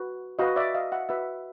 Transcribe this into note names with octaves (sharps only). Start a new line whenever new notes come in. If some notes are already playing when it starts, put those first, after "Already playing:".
Already playing: F#4 B4
F#4 B4 D#5 F5
D5 E5
D#5 F5
E5 F#5
F#4 B4 E5 F#5